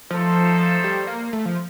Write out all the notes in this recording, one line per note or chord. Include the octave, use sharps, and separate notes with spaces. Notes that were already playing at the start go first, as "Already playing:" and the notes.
F3 A3 D#4 A4 C5
G3
A#3
A3
F3